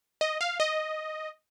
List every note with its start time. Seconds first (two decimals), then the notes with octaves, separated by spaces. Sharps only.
0.21 D#5
0.41 F5
0.60 D#5